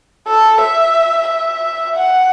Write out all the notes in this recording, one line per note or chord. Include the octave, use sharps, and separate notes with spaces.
A4
E5
E5
F#5